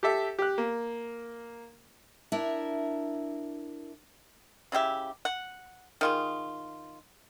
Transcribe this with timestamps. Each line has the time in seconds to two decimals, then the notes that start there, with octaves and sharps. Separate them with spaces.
0.03 G4 A4 E5
0.39 G4 F#6
0.58 A#3
2.32 D4 E4 A#4 E5
4.72 C#3 E4 G4 E5
5.25 F#5
6.01 D#3 F4 G#4